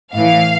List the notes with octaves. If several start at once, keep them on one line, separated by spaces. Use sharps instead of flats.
A2 E3 F5